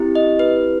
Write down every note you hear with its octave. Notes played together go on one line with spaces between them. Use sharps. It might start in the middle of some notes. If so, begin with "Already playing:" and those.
Already playing: C4 E4 G4
D#5
B4